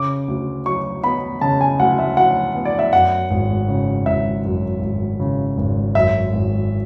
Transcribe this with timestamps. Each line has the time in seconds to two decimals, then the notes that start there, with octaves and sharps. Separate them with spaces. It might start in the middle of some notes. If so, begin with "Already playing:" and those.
Already playing: C#3 D6
0.28 D2
0.66 F#3 C#6
1.04 B3 B5
1.41 C#3 A5
1.61 G#5
1.80 D2 F#5
1.99 E5
2.17 F#3 F#5
2.55 B3
2.65 D5
2.79 E5
2.93 F#2 F#5
3.31 G#1
3.68 C#3
4.06 G#1 E5
4.45 F#2
4.82 G#1
5.20 C#3
5.58 G#1
5.95 F#2 E5
6.33 G#1